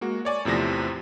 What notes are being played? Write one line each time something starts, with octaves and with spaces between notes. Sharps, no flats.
G#3 A#3 F#4
C#5 D5 G#5 C#6
E2 A2 C3 F3 A#6